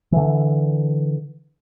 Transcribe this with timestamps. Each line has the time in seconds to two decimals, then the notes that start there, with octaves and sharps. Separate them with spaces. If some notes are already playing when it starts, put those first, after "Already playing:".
0.12 D3 E3